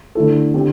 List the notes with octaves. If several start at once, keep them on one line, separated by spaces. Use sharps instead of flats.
D3 A3 E4 A4
D3 C4 G4